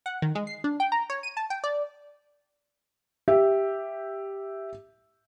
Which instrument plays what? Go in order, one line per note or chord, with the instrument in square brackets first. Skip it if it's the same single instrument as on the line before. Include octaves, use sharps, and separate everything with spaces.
[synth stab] F#5
D#3
G#3
C7
D4
G5
A#5
C#5
D#7
A5
G5
D5
[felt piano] G4 E5